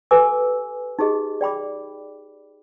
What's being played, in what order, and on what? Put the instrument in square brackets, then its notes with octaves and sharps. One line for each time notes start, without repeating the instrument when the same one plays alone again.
[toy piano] G4 A4 B4 G#5 D6 E6
D#4 G4 G#4 D#5
D5 G5 B5 D6